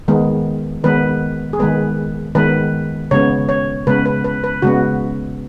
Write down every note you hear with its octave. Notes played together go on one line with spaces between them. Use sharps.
D#3 G#3 B3
D#3 G#3 B3 B4
G#4
D#3 G#3 B3 B4
D#3 G#3 B3 B4
C#3 G#3 B3 C#5
C#5
C#3 G#3 B3 B4
B4
B4
B4
C#3 G#3 B3 F#4